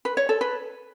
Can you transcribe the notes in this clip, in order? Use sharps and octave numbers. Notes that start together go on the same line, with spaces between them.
B4
C#5
A4
B4